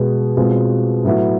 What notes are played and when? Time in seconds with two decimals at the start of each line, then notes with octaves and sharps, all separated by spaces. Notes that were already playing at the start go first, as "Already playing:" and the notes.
Already playing: B2 G#3 B3
0.37 B2 G#3 C4 F4
1.04 A2 F#3 B3 E4